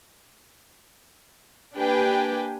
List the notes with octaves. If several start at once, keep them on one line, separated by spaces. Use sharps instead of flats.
A#3 D4 G4 B4 G5 G#5